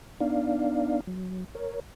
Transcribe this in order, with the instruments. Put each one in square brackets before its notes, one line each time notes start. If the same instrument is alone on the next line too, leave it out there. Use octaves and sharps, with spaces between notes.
[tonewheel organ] B3 D4 D#4 D5 F5
F#3
A#4 C#5